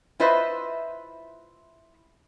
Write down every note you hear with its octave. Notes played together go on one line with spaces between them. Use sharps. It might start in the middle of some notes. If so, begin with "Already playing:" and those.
E4 F4 B4 C5 D#5 E5